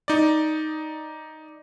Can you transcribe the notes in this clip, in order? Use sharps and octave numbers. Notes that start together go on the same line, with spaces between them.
D#4 D5